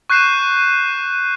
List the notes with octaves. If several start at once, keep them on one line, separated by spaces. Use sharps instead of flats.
C#6 F#6 G6 C7 D#7 E7